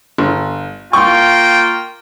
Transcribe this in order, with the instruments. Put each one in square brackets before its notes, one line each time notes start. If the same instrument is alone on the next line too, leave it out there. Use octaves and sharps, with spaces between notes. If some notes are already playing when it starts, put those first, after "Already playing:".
[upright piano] G1
[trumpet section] A#3 F4 G5 [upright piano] C6 C#6